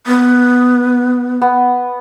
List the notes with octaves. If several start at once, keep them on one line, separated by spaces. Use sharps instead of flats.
B3
B3